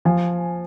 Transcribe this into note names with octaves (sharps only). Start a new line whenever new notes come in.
F3 G#5